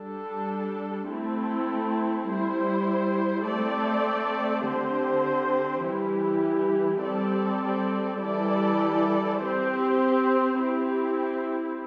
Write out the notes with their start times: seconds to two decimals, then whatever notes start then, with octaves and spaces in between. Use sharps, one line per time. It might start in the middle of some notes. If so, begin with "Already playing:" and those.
Already playing: G3 D4 A4
1.09 A3 C4 E4 A4
2.28 G3 E4 C5
3.46 A3 C4 A4 D5
4.65 D3 C4 G4 C5
5.84 E3 G3 E4 G4
7.02 G3 C4 A4 D5
8.21 E3 G3 E4 A4 D5
9.39 C4 G4 C5
10.59 C4 E4 G4